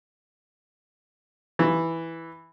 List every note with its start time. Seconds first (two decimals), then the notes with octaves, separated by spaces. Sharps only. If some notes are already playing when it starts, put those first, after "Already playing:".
1.59 E3